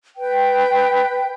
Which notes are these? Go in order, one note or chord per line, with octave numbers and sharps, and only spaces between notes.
B4 G5